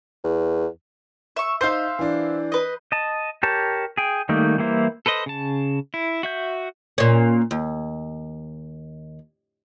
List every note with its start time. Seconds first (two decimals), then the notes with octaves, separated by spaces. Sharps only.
0.24 E2
1.36 E5 C#6
1.61 D#4 C5 E5 F5 G6 C7
1.99 E3 D4
2.52 B4 D#5
2.92 D#5 A5
3.43 G4 A#4 C#5 A5
3.97 G#4 G5
4.29 D#3 G3 A3 A#3 D#4
4.58 E3 G3 A#3 E4 C5
5.06 A4 B4 C5 D#5
5.26 C#3 A5
5.94 E4
6.23 F#4 E5 G6
6.98 A#2 C#4
7.51 D#2